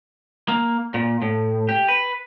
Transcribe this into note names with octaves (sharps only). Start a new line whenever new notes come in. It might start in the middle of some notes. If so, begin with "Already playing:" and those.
A#3
A#2
A2
G4
B4